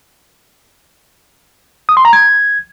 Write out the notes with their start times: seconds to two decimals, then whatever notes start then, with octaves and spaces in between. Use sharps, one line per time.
1.89 D#6
1.97 C6
2.05 A#5
2.13 G#6